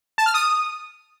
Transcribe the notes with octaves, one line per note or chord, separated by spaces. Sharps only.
A5
F6
D#6